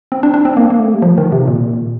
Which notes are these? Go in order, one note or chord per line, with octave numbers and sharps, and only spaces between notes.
C4
D4
D4
C4
A#3
A#3
A3
G3
F3
D#3
C3
A#2